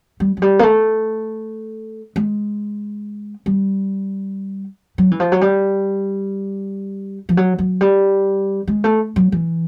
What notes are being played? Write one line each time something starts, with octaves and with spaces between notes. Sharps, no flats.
G3
F#3
G3
A#3
A3
G#3
G3
F#3
E3
F3
F#3
G3
F3
F#3
F#3
G3
G#3
A3
F#3
E3